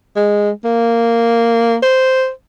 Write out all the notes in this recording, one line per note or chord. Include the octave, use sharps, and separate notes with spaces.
G#3
A#3
C5